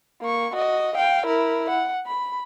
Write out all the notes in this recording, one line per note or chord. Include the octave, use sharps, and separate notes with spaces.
A#3 C#6
F#4 D#5
F5 G5
E4 A#4
F#5
B5